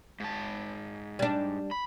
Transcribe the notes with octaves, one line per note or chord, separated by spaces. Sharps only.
G#2 A5
G3 D4
B5